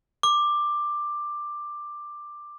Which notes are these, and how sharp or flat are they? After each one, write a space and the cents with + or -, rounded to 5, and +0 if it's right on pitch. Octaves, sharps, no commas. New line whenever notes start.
D6 +10